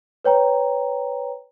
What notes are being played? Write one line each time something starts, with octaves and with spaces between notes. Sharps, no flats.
B4 C#5 G5 A#5